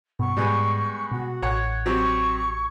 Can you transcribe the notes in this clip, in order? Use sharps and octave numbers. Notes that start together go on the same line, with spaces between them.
G2 B2 C#6
G#2 G3 G#3 B3
B2 F#4
A1 C#5 F#5 G#6
F#3 C4 G4 C#6